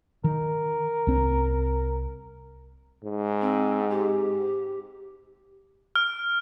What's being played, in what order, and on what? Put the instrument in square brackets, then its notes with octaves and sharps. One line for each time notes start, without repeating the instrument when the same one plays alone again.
[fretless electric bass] D#3 [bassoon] A#4
[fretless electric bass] C2 C4
[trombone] G#2
[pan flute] C4
G4
[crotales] F6